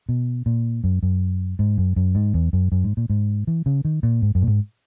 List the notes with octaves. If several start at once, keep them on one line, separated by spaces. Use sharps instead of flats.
B2
A#2
F#2
F#2
G#2
F#2
F#2
G#2
E2
F#2
F#2
G#2
A#2
G#2
E3
C#3
D#3
A#2
G#2
F#2
A#2
G#2